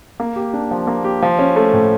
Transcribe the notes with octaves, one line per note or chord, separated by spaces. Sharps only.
A#3
G4
D4
F3
A#3
G4
F3
C#4
A3
A2